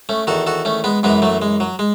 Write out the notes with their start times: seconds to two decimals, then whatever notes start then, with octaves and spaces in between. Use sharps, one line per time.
0.09 A3 C#4
0.27 E2 D#3 F#4 A4
0.47 F#4 A4
0.65 A3 C#4
0.84 G#3 B3
1.03 F#2 E3 G#3 B3
1.22 F#3 A3
1.42 G#3
1.60 F#3
1.79 G#3